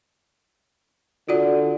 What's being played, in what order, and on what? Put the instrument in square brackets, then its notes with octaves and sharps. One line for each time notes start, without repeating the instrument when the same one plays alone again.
[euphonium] D3 [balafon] F4 F#4 D5